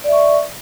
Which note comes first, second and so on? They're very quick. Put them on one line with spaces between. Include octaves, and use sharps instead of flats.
D5 E5 C#6